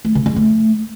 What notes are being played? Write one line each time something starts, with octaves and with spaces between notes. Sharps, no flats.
A3
C#3
C#3
A3